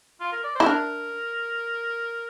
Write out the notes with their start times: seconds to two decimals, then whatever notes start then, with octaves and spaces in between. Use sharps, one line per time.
0.20 F4
0.32 A#4
0.44 D5
0.55 E4 C5
0.66 D4 A#4